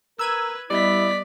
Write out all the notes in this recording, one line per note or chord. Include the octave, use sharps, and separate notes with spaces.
A#4 B4 E6 G#6 D#7
G3 B3 E4 D5 D#5 B6